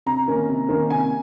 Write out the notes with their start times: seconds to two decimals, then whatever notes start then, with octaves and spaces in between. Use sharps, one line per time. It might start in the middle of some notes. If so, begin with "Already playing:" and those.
0.06 C3 A#5
0.28 D#3 A#3 C#4
0.49 C3
0.69 D#3 A#3 C#4
0.90 C3 G#5